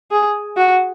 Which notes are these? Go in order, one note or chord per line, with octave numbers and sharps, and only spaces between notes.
G#4
F#4